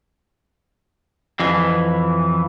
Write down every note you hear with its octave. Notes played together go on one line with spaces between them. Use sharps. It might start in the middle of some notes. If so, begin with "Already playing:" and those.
F2 E3